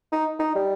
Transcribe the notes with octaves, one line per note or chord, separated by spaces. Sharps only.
D#4
D#4
G3